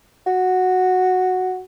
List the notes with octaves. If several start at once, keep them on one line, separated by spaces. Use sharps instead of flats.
F#4